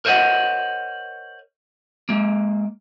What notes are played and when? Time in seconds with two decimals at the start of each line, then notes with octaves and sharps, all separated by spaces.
0.05 A#4 C5 C#5 D#5 F#5
2.09 G#3 A#3